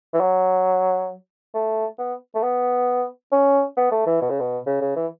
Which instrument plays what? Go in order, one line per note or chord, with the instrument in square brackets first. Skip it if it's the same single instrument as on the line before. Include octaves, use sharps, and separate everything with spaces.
[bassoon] E3
F#3
A3
B3
A3
B3
C#4
B3
A3
E3
B2
C#3
B2
C#3
C#3
E3